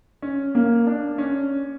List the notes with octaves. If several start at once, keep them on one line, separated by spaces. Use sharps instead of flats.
C#4
A#3
D4
C#4